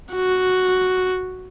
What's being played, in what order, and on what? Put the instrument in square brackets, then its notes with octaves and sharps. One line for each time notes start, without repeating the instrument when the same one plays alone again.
[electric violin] F#4